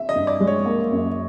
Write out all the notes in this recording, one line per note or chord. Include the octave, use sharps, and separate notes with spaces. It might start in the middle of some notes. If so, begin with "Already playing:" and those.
Already playing: E5
D#5
G2
D5
G#3
C#5
A#3
F#2